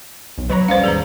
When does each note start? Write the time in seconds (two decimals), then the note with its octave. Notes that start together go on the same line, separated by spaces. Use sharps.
0.38 B1
0.50 F#3 B4 C#5 A#5
0.68 D#1 G3 C#4 C5 D5 F5
0.84 G#1 D#2 G#4 B4 A#5